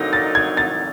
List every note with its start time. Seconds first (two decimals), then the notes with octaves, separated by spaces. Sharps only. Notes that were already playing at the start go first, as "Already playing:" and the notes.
Already playing: D3 F#3 A#3 D#4 A#6
0.13 A6
0.35 G#6
0.57 A6